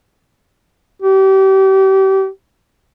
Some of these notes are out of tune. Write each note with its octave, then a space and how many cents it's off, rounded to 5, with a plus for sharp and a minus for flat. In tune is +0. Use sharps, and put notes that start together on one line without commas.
G4 -30